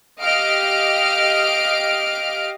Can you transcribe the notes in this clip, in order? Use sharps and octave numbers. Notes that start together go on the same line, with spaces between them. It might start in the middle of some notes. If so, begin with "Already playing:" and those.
G4 D#5 F5 F6 D7